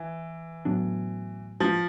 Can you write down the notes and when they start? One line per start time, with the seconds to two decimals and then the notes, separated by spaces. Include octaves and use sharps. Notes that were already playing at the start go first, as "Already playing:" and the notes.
Already playing: E3
0.65 A2 F#3 B3 D4
1.60 F3